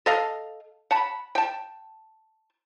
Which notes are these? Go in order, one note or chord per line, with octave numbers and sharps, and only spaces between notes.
A4 D#5 F5
F#5 A5 B5
G5 A5